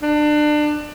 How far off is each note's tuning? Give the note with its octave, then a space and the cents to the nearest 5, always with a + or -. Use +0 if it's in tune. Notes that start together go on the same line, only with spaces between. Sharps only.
D4 +25